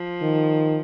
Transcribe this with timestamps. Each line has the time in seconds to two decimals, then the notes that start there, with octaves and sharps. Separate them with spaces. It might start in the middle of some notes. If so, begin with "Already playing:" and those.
Already playing: F3
0.22 D#3